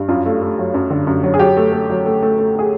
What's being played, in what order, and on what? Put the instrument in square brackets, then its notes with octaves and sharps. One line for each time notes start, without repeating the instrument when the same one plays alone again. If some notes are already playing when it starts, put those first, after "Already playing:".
Already playing: [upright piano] G2
F#2 F4
A3
A3
F#3
F#2
D3
F#2
F#3
G#4
F#3 G4
A3
A3
F#3
A3
A3
A3
A3 G#4